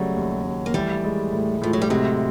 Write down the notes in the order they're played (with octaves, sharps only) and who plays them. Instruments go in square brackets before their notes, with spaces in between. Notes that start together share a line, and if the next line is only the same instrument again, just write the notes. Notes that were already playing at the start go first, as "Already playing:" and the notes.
Already playing: [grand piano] C#3 F#3 [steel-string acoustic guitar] G3 A3
[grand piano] D#2
D#2
[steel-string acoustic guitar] A#3
[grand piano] E3 [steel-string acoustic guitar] G3 A3
[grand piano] G#3
A2
[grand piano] A2 [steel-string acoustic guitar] F3
[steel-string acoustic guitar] F#3
G3
[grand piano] C3 [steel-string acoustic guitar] F#3 G#3